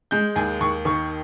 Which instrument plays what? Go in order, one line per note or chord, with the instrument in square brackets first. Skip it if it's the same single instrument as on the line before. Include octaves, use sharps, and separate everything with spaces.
[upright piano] G#3 G6
D#2 G#5
D#2 C#6
D#3 C#6